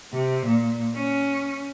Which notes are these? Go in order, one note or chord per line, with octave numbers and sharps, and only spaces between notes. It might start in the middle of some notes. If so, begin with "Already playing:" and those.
C3
A#2
C#4